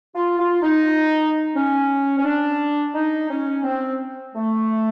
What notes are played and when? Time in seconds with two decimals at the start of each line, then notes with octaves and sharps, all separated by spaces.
0.15 F4
0.39 F4
0.62 D#4
1.55 C#4
2.18 C#4
2.24 D4
2.94 D#4
3.29 C#4
3.64 C4
4.34 A3